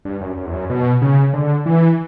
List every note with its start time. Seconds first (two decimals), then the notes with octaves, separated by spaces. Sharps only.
0.05 G2
0.21 F#2
0.38 F#2
0.46 E2
0.53 F#2
0.70 B2
1.02 C#3
1.33 D3
1.66 E3